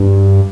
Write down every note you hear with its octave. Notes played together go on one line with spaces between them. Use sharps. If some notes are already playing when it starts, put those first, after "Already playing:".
Already playing: G2